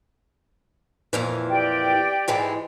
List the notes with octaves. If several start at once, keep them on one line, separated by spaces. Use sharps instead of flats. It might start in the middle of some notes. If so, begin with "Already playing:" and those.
F2 A#2 E3
G4 D5 G5
G#2 E3 G#3